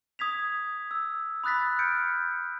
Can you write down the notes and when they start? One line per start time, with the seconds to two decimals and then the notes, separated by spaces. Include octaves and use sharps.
0.19 D#6 G#6 B6 F7
0.91 E6
1.44 B5 D#6 F#6 A6 B6
1.79 F6 G6 A6 C#7 D7